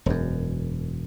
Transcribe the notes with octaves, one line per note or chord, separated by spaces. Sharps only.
E1 F#2